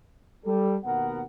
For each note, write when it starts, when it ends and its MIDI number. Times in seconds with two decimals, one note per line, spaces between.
0.45 0.76 55
0.45 0.76 69
0.84 1.22 39
0.84 1.22 47
0.84 1.22 59
0.84 1.22 70
0.84 1.22 78